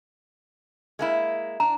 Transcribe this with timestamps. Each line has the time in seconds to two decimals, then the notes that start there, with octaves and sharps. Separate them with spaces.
0.99 G#3 A#3 E4
1.60 D4 A#5